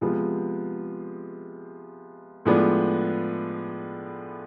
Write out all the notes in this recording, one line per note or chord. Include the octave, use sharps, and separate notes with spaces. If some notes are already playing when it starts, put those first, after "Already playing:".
C3 F3 G#3 B3
A2 F3 G#3 B3 D4